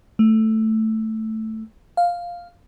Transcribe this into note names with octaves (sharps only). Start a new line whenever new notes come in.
A3
F5